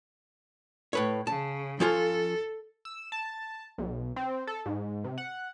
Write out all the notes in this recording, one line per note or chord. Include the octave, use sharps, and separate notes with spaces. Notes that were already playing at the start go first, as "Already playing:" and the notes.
A2 B4 C#5
C#3 A5
F3 C#4 F4 A4
E6
A5
B1
C4
A4
G#2
C3
F#5